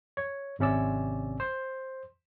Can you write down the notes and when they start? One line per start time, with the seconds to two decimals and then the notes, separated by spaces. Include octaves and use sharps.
0.17 C#5
0.59 G#1 C3 C#4 D5 E6
1.40 C5